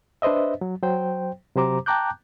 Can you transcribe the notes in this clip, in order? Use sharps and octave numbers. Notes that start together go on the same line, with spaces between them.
D4 B4 C5 D#5 E5
F#3
F#3 C5 G5
C3 F#3 G4 C5 A#5 D6
G5 A5 A#5 D6 F#6 G6